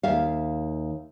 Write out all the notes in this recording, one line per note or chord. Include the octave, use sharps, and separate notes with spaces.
D#2 E5 F5